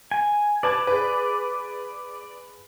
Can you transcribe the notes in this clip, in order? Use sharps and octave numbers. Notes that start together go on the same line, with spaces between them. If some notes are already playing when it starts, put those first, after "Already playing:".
G#5
B4 D5 A5 G#6
G#4 B4